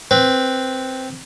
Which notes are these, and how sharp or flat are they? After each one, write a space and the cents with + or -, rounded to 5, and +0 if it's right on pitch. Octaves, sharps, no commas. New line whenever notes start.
C4 +0 B4 +0